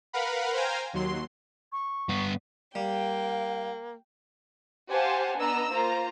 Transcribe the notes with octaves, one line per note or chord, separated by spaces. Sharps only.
A#4 B4 F5 F#5 B5
C5 F5 G5 G#5 A#5
D#2 F#3 C6
C#6
G2 B3
G3 A#3 F5 G5
G4 C5 F5 F#5 G#5 A5
B3 D4 D#5 A#5 E6
A#3 F4 C5 A#5